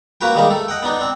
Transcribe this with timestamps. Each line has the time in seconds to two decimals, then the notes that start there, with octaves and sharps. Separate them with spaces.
0.21 A#3 C#4 F#4 B4 G5
0.35 D#3 G3 G#3 A#3 D#4
0.50 A3 A4
0.68 D#5 F#5 G5
0.83 B3 D4 D#4
0.99 C4 D4